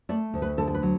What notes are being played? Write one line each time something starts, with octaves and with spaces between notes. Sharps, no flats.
A3 D5
D2
B4
D3 A4
A4
B4
F#3